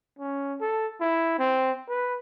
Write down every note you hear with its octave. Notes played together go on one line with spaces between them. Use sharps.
C#4
A4
E4
C4
B4